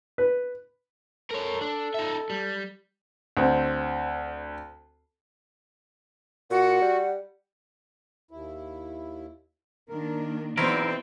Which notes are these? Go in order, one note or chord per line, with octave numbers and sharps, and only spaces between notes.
B4
A4 A#4 C#5
D4
D#4 E5
G3
D2 C4
A#2 F#4 F#5
G3
D#2 E4
D#3 A#3 D4 A#4
E2 B2 F#3 C4 D#4 E4 A#4 D5